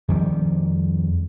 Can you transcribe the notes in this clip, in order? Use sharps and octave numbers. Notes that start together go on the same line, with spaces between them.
F2 D#3 G3